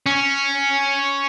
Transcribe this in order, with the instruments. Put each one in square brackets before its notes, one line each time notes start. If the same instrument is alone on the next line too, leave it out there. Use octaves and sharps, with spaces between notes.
[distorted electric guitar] C#4